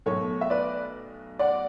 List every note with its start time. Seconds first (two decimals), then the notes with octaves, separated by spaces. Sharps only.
0.06 B1 B2 A3 A4 C#5
0.41 E5
0.50 B4 D5
1.39 D5 F#5